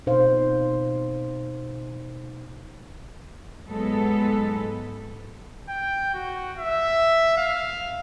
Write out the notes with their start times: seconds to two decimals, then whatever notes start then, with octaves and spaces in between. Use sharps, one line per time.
0.07 B2 D#4 C5 F5
3.68 G#2 F#3 G#3 B3 A4
5.69 G5
6.14 F#4
6.58 E5
7.37 F5